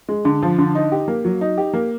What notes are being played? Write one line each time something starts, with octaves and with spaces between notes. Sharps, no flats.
G#3
D3
F3
D3
D#4
G4
A#3
F#3
D#4
G4
A#3